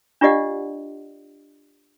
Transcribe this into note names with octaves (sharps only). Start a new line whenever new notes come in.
D4 F4 G4 D5 D#5 F#5